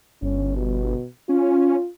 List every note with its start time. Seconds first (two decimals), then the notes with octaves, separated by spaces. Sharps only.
0.22 G1 C#4
0.57 B2
1.29 C#4 F4